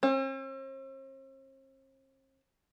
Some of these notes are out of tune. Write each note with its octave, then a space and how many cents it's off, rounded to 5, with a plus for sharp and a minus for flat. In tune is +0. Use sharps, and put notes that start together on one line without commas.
C4 +45